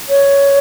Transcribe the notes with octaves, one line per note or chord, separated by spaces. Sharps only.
C#5